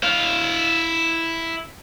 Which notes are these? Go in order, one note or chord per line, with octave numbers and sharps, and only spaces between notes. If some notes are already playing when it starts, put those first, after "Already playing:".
E4 F5